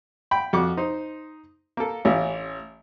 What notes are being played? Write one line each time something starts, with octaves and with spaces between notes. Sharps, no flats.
G5 B5
F2 F#4 F#5 D6 F#6
D#4 C5
A#3 A4
A1 E3 C#4 F4 G4